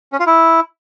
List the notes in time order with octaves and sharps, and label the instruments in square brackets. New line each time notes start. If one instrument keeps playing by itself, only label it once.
[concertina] C#4
F4
E4